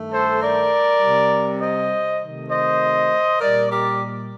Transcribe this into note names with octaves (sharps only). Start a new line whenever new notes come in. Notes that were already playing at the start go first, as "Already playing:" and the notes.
Already playing: G2 D#3 A3
A4 C5
A#4 D5
C3 G3
C5 D#5
C3 D#3 A3
C5 D#5
A#2 G3 A#4 D5
G4 A#4